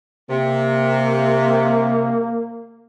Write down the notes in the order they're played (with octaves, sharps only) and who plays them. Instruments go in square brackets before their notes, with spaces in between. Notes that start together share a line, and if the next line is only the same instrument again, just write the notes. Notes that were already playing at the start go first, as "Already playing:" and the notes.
[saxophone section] C3 [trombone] A#3